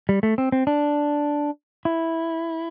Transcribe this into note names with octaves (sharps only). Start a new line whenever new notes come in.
G3
A3
C4
C4
D4
E4